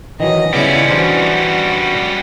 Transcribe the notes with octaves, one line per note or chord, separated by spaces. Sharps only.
D#3 E3 F#3 D#5
C#3 G3 B3 C#4 E4 D5
E3 D4 F#4 C5